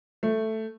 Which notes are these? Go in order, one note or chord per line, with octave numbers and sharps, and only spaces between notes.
A3